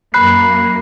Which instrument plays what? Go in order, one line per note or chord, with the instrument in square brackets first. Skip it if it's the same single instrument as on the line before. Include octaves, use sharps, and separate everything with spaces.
[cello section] F#2 A#3 [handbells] B5 F#6 C7